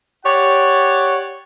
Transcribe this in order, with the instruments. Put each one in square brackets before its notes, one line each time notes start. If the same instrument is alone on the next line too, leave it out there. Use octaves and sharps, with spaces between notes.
[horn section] G4 C#5 D5 F#5